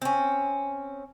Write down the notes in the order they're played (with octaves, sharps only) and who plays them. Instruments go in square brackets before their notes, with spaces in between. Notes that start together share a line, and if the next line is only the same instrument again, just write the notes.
[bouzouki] C4 C#4